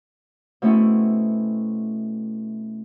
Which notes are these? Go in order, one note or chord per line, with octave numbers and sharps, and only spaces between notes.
B2 A3 C4 C#4 E4